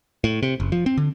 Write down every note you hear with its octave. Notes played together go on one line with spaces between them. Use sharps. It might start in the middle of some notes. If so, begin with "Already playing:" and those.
A2
C3
F#1
F3
C4
D3